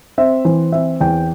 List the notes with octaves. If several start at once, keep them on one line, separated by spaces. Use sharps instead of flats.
C4 E5
E3 C5
C4 E5
E2 G5